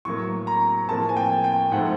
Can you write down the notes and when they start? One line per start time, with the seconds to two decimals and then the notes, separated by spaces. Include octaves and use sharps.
0.05 A2 F#3 A#3 C#6
0.47 A#5
0.88 A2 F3 A#3 A5
1.09 G#5
1.17 G5
1.44 G5
1.72 G#2 F3 A3 F#5